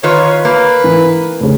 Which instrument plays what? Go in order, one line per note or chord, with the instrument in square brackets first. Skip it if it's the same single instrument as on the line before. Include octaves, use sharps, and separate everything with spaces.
[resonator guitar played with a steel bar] D#3 F4 B4 [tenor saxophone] C#5
[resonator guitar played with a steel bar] A#3 [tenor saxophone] B4
[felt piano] E3
F1 C#3